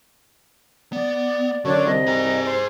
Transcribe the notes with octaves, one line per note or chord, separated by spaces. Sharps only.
B3 D5
F#2 D3 D4 C#5 C#6
C2 D#5
G#4 A#5
C5